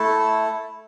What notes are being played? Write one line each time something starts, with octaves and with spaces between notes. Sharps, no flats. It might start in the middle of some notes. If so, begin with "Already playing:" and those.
Already playing: A3 E4 A4
E6